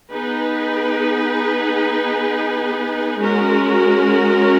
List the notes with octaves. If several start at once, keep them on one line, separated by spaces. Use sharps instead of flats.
B3 D#4 G#4 B4
G#3 C#4 F#4 A#4